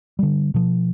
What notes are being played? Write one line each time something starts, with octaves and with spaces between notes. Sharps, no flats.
D3 G3
B2 F3